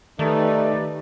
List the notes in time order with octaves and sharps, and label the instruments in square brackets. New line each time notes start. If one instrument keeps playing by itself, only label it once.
[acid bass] D#3 [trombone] A3 [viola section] D#4 G4 B4 [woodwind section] D5